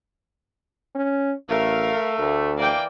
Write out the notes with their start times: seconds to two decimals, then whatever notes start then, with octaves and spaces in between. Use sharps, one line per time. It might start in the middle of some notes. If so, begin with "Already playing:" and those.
0.95 C#4
1.49 A1 A3 A#4 F5
2.19 D2
2.58 E3 A#3 D5 G5